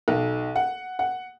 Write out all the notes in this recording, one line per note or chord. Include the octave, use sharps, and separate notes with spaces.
B1
F#5
F#5